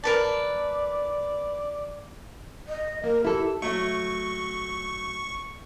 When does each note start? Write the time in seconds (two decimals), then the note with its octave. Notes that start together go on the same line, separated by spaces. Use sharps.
0.04 A#4 B4 D5 A5
2.68 D#5
3.04 A#3 A#4
3.25 E4 G4 A4
3.62 F#3 A3 C#6